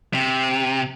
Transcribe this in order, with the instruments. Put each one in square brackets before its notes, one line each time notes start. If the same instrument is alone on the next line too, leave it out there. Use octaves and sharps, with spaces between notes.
[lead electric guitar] C3